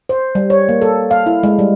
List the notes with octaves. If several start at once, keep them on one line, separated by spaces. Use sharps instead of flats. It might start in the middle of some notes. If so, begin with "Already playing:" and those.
C5
G3
C#5
A#3
A4
F5
E4
G#3
G3